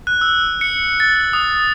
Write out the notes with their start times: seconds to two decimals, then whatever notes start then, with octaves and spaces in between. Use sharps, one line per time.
0.07 F#6
0.21 E6
0.61 C#7
1.00 A6
1.33 D#6